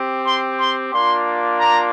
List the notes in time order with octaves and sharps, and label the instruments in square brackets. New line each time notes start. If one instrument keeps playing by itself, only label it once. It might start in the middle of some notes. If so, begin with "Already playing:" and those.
Already playing: [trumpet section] C4 G4
C6
C6
A#3 D4 F4 C6
A#5